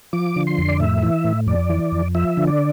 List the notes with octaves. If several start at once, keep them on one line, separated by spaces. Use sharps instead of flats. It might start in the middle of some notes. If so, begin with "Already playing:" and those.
F3 D6
D3
C6
F2
D5
A2 E5
E3
A2
F2 D5
E3
F2
F3 E5
D3
D5